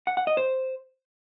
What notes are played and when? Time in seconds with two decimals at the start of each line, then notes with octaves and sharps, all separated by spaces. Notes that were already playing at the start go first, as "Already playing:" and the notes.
0.07 F#5
0.17 F#5
0.27 D#5
0.37 C5